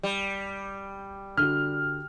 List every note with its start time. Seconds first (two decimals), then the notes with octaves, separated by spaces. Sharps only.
0.03 G3
1.37 D3 F#4 F6